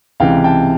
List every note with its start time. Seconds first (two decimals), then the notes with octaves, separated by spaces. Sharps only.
0.20 C#2 C3 E3 F5 G5
0.44 G5 A5